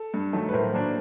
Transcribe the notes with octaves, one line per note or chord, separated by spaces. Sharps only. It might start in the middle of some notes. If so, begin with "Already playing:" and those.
Already playing: A4
G2
D#3 F#3 A3
B4
A2 A#4 C5
F#3 A#3 D4